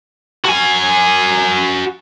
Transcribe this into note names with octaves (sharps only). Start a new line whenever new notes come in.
F#4 G#5